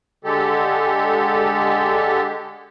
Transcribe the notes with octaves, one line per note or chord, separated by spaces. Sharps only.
D3 G#3 G4 A4